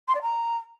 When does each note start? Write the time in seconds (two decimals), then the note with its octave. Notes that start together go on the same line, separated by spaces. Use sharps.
0.08 C6
0.14 D5
0.21 A#5